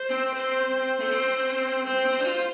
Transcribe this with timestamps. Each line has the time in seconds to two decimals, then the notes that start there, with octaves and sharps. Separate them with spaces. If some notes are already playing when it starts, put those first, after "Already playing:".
Already playing: C5
0.10 C4
0.35 C5
1.00 A3
1.11 C4
1.87 C4 C5
2.05 C4
2.20 D4
2.24 F4
2.38 F4